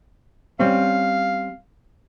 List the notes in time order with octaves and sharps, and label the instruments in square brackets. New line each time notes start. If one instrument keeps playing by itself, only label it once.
[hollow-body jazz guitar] G3 C4 C#4 [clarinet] F5